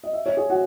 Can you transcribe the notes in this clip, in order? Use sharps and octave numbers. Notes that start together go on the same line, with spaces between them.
D#5
E5
C#5
G#4
F#4